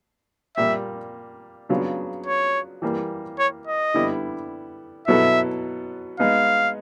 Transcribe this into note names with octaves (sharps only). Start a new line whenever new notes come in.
A#2 G3 A#3 E5
C#3 F#3 B3 D4 F4
C#5
E3 G3 A#3
C#5
D#5
D3 G3 B3 E4
B2 F#3 B3 E4 A4 E5
G#3 B3 D#4 F5